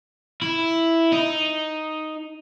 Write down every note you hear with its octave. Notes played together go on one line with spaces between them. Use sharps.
E4
D#4